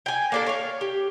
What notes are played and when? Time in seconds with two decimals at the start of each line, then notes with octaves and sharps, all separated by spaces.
0.06 G5 G#5
0.32 A#3 D4 A4
0.46 C#5 F5
0.81 G4